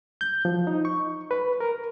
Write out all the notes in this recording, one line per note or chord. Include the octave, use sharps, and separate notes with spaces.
G6
F3
D#4
C#6
B4
A#4